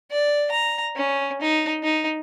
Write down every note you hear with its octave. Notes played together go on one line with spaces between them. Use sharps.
D5
A#5
C#4
D#4
D#4